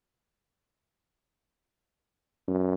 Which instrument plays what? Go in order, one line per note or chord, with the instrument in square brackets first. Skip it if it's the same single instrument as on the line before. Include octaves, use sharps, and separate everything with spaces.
[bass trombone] F#2